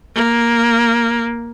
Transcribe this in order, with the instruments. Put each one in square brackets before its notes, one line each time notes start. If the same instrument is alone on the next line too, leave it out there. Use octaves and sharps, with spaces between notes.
[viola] A#3